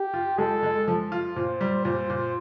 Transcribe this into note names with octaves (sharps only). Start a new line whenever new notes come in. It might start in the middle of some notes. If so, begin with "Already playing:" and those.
Already playing: G4
F4
G#3 A4
G#3
F3
F4
A#2 C5
G3
A#2 C5
A#2